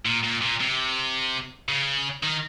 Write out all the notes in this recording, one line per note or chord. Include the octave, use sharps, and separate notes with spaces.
A#2
A#2
A#2
C3
C#3
D#3